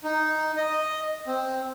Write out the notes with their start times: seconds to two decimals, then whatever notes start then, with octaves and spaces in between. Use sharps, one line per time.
0.04 D#4
0.57 D#5
1.27 C4